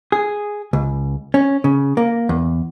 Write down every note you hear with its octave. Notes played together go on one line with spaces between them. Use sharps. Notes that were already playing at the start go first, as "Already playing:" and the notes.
G#4
C#2
C#4
C#3
A#3
E2